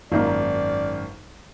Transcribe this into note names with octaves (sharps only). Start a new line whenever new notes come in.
G#1 F#2 A#3 D#4 F4 D5